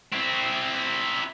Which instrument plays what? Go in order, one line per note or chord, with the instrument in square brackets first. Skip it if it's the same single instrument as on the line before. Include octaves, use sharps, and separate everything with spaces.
[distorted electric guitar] C4 E4